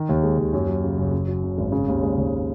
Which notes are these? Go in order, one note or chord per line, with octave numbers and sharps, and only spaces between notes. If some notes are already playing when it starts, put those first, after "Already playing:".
Already playing: D#3
D#2
G#3
D#2
F#2
F#3
C#3
F#1
F#2
F#3
C#3
G#1
C#3
D#2
G#3
D#2